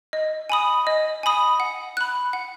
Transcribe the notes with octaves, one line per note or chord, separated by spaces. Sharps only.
D#5
G#5 B5 D#6
D#5
G#5 B5 D#6
F#5
B5 F#6
F#5